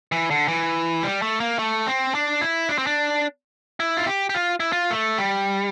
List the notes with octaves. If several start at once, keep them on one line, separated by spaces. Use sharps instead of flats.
E3
D3
E3
G3
A3
A#3
A3
C4
D4
E4
D4
C4
D4
E4
F4
G4
G4
F4
E4
F4
A3
G3